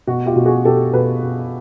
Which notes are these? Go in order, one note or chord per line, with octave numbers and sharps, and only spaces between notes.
B2 F#4
F4 G4
B2
F#4 G#4
B2 G4 A4
B2 A4 B4
B2